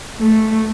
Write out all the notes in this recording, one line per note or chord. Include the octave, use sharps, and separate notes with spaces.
A3